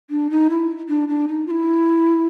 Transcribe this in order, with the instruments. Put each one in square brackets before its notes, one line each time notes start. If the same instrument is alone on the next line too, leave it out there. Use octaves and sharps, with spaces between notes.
[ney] D4
D#4
E4
D4
D4
D#4
F4
E4